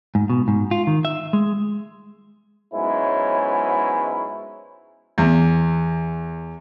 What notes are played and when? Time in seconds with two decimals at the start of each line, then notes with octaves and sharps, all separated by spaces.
0.15 G#2
0.30 B2
0.48 G#2
0.71 F4
0.87 D#3
1.05 E5
1.33 G#3
2.74 G#2 F#3 G#3 B3 C#4 E4
5.18 E2